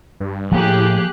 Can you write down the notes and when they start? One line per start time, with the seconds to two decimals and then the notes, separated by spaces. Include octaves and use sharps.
0.20 G2
0.52 A2 F3 A#3 G4 G#4 F#6